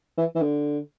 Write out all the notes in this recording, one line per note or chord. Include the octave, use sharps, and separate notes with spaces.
E3
E3
D3